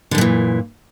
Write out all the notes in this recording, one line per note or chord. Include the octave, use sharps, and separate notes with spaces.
F#2 A#2 D3 E3